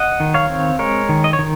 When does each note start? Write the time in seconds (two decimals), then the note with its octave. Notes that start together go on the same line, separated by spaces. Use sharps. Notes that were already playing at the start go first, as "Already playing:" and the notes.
Already playing: D#5 F#5
0.20 D#3
0.34 C#5 F5
0.50 C4
0.79 G#3 A#4 C#5
1.09 D#3
1.24 D#5
1.33 C#5
1.39 D#3